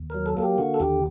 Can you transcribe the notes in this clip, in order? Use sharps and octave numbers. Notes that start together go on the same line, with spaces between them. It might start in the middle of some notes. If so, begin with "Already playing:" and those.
Already playing: D#2
F#3 A#4
A4
A#3 A4
G4
D3 F#4
A4
D#2 G4